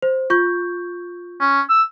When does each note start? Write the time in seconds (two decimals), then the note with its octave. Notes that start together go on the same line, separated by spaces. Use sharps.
0.02 C5
0.30 F4 C#6 G6
1.40 C#4
1.69 E6